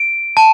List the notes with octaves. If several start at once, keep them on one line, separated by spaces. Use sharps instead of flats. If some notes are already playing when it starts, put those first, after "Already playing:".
Already playing: D7
A5